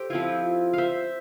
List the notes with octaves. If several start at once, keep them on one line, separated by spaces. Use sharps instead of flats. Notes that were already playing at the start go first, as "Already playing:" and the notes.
Already playing: G4 A4 C5
F3 C4 E4 F4
C5 E5 F5